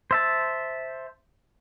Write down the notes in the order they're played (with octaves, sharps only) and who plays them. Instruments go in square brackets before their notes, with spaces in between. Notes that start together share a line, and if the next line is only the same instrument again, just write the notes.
[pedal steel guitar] C5 E5 A5